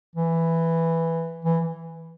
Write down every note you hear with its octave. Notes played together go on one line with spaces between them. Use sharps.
E3
E3